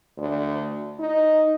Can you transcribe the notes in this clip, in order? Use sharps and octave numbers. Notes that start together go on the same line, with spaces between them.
D2
D#4